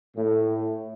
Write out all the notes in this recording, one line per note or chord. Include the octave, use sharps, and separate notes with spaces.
A2